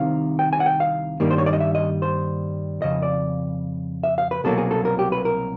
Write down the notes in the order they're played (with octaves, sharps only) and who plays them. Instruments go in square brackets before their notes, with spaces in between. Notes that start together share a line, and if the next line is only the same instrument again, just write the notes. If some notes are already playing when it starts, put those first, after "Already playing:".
Already playing: [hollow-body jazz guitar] C2 C3 D#3 F5
G5
G#5
F#5
G5
F5
G2 D#3 G3 A#3
C5
C#5
D5
D#5
E5
D#5
C5
F2 C#3 D#5
D5
E5
F5
B4
C2 B2 F#3 A#3 A4
G#4
A4
A#4
G4
B4
A#4